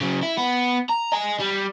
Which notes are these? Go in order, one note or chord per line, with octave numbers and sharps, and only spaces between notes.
C#3 F#3
E4
B3
A#5
D#5 G#5
G3